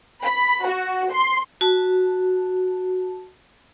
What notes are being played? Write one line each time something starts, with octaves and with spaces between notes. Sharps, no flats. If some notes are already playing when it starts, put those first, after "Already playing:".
B5
F#4
C6
F#4 A5